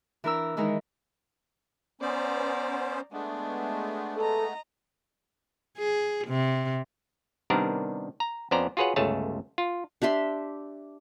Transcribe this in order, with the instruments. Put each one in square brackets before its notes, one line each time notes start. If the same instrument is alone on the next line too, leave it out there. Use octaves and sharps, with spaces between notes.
[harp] E3 D4 A#4 A#5 E6
D#3 E3 G#3 D#4 A#4
[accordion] B3 C#4 C5 [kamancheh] D5 A#5
[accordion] G#3 A3 B3 [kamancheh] D4 G#4
[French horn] A4 [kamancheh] D#5 A#5
[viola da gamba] G#4
C3
[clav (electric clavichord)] C3 D#3 G3 B3 D4 A#4
A#5
F2 B3 C#4 C5 D5 A#5
F4 F#4 G#4 B4 C#5 F#5
G1 C#2 A3 G#4 C#5 A5
F4
[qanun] D4 G4 E5 C6